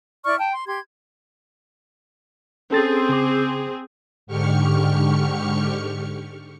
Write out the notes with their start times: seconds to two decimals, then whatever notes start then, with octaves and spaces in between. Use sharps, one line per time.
0.24 E4 D5 C#6 F6
0.39 G5 A5
0.51 C6
0.67 G4 C6 G#6
2.71 C4 C#4 G#4 A4 A6
3.09 C#3 D6
4.27 G#2 D3 G4 C#6 F6 C#7